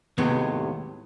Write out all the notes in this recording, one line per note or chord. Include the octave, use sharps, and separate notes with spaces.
D#2 A2 C3 F#3 G#3 B3